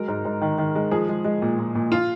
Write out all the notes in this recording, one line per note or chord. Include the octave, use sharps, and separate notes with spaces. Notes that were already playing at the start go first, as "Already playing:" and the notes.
Already playing: F#3 G#3 A#4
G#2
G#2
D#3
D#3
G#3
F3 G#4
G#3
G#3
A#2
A#2
A#2
F4